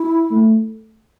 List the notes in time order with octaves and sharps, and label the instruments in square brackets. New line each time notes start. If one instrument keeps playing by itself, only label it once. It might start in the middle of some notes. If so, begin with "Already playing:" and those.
Already playing: [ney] E4
[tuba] A3